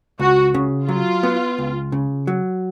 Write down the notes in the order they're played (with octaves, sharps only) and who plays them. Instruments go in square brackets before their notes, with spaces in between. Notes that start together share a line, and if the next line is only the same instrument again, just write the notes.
[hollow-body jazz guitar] C#2 [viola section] F#4
[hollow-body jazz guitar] C#3
[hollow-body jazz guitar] F#3 [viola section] F4
[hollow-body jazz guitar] B3
C#2
C#3
F#3